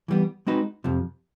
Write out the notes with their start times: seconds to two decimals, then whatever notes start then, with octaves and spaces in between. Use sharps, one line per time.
0.08 E3 G3 B3
0.47 G#3 C4 D#4 F#4 B4
0.84 F2 C3 F3